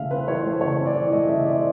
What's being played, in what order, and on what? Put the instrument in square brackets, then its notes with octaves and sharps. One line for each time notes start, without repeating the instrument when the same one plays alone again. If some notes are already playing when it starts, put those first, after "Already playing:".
Already playing: [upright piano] C#3 E3 A3 E5 F5
C4 B4
E3 C#5
C5
A3
C#3 C#5
C4
D5
E3
A3 D#5
C#3 E5
C4 D5